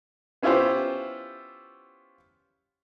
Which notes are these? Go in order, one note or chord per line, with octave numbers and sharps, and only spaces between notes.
B3 C#4 E4 F4 G4 C5